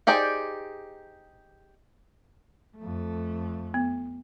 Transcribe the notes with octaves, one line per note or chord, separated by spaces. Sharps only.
D#4 G4 G#4 C5 D5
F2 A3
B3